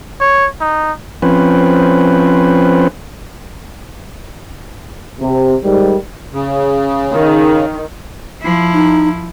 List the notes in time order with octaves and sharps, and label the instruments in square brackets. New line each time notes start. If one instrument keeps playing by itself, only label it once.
[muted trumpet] C#5
D#4
[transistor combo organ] F3 C4 C#4 B4
[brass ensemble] C3
G#2 D#3 G3
[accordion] C#3
[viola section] D#3
[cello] F3 E4
[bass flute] D#4